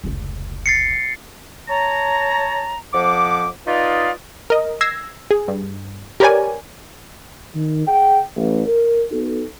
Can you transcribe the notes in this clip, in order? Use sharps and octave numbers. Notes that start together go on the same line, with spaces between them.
F1 C#2
A6 C7 C#7
C#5 A5 A#5
F2 F3 F#5 D6
D#4 F4 B4 D5 D#5 F5
A#4 D#5
E6 G#6 A#6 C7
G#4
G2
G4 A#4 B4 C#5 D5 G#5
D#3
G#4 F#5 G5
A1
A#4
B3 D#4 F#4 A4